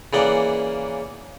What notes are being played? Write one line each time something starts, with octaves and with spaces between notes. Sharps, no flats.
C#3 E3 A#3 D5 F#5